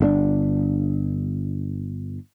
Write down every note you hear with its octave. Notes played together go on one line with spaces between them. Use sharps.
G1 D3 D4